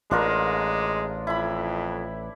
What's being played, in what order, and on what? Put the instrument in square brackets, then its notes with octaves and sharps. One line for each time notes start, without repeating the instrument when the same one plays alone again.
[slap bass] A1 [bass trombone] G#3 [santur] D4 F4 A#4
[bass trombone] F2 [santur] E4 B5